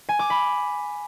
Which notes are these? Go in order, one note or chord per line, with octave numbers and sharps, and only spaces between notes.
G#5
D6
B5